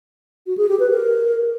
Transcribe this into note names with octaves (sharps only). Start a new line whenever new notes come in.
F#4
G#4
G4
B4
A#4